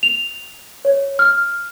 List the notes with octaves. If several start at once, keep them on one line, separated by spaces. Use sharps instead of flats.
F7
C#5
F6